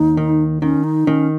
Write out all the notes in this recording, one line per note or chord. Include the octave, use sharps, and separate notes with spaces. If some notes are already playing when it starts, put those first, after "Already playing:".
Already playing: D#2 D#4
D#3
D#3 C#4
D#4
D#3 C#4